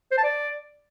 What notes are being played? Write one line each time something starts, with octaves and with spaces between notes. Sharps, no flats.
C5
A5
D5